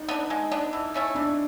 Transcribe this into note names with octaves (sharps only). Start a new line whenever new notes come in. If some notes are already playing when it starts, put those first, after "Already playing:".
Already playing: D#4
B3 D4
G#3
B3 D4
E3
A3 C#4 E4
E3 D4